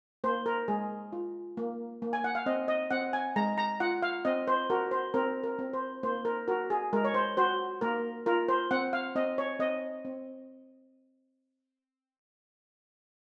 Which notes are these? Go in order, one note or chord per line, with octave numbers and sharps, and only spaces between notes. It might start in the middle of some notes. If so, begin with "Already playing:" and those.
A#3 C5
A#4
G#3 G#4
F4
A#3
A#3
G#5
F#5
F5
C4 D#5
D#5
C4 F#5
G#5
G#3 A#5
A#5
F4 F#5
F5
C4 D#5
C5
F#4 A#4
C5
C4 A#4
A#4
C4
C5
A#3 C5
A#4
F#4 A#4
G#4
G#3 A#4
C#5
C5
F#4 C5
A#3 A#4
F4 A#4
C5
C4 F#5
F5
C4 D#5
C#5
C4 D#5
C4